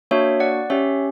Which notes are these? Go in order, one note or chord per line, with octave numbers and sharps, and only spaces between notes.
A#3 D4 F#4 C#5 E5
D5 F#5
C#4 G4 C#5 E5